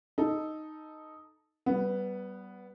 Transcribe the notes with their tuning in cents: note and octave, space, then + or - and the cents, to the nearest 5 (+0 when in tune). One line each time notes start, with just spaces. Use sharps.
D#4 +0 A4 -5
G3 -25 B3 +0